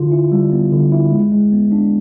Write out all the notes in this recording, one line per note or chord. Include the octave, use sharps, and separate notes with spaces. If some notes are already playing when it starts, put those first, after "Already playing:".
Already playing: D3 F4
E4
G3
B3
D3
E4
G#3
G#3
B3
D4